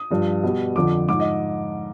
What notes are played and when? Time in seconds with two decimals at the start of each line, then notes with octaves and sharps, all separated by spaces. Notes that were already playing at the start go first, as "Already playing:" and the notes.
Already playing: D#6
0.10 G2 F3
0.43 B2 G3
0.76 F2 D3 F3 D6
1.09 G#2 F3 D6
1.20 D#5